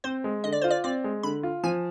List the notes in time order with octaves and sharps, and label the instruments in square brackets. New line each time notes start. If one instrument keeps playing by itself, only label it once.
[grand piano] C4 [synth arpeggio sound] C5
[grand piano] G#3
[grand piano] D3 [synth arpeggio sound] D#5
[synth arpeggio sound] D5
[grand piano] F4 [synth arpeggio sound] C5
[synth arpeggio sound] D5
[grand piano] C4 [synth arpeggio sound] D5
[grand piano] G#3
[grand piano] D3 [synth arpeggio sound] B5
[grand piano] F4
[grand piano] F3 [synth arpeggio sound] G#5